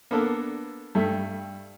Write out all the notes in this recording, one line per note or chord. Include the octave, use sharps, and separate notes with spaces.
A#3 B3 D4 A4 A#4
G2 G3 A3 E5